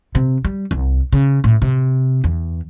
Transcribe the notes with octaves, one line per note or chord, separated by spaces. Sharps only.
C3
G3
C2
C#3
A2
C3
E2